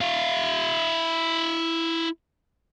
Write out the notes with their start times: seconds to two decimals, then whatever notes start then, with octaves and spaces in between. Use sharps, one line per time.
0.01 E4 F5